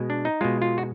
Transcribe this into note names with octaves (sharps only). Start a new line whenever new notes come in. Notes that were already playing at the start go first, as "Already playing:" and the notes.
Already playing: B2 G#3
D4
D#4
B2 G#3 F4
F4
F#4